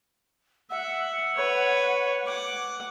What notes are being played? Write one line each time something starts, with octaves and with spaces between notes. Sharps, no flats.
E5 F#5
B4 C#5
F#5 D6